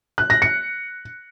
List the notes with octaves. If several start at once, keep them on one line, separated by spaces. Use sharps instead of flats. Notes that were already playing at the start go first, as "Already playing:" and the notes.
F#6
A#6
C#7